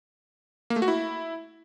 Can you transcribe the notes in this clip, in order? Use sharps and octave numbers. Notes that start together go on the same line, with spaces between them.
A#3
A3
F#4
E4